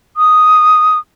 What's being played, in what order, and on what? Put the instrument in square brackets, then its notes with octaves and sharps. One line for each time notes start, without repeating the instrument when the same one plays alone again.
[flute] D#6